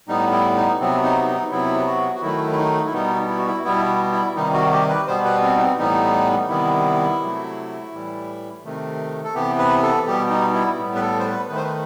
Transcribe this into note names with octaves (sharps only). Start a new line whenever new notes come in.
A2 G3 B3 D#4
E4
D#4
C3 F#3 B3 C4
D#4
D#4
C3 F#3 B3 E4
F#4
F#4
D#3 F#3 A3 E4
E4
D#4
E4
B2 G3 B3 D#4
E4
F#4
E4
B2 G3 B3 E4
E4
C3 D#3 G3 D#4
F#4
G4
B4
B2 G3 B3 C5
B4
C4
D#4
C4
A2 E3 G3 B3 D#4
C3 D#3 G3 B3 E4
C3 F#3 A3
A2 E3 G3
C3 D#3 A3
A4
C3 E3 B3 G4
B4
A4
B2 G3 B3 G4
D#4
E4
A2 G3 B3
B4
A4
C5
B4
D#3 A3 B4
C5
B4